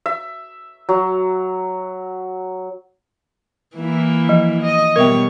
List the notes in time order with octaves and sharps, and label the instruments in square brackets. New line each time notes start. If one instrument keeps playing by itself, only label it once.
[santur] E5
F#3
[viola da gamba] E3 A#3 E4
[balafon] F3
[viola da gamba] D#5
[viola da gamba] B2 G3 C#5 [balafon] A#4 E5 G5